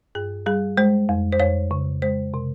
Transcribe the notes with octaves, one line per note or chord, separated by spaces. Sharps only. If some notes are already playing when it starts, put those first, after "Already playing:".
G2 G#4
G3 G#4
G#3 C5
F2
C5
F2 C#5
C#3
G#3 C5
C3